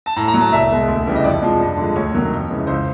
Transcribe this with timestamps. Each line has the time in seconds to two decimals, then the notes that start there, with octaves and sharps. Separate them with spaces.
0.06 A5
0.16 A2 A#5
0.28 A#5
0.34 F#3
0.40 A5
0.52 C2 E5
0.70 B2 G#3
0.88 D2
1.06 C#3 E3 G3
1.15 D#5
1.24 F2 D5
1.42 C3 F3 G#3
1.60 G2
1.77 D3 F3 G#3
1.96 D2 C#5
2.13 C3 D#3 F#3
2.32 F2
2.50 C#3 E3 G#3
2.67 C#2 C5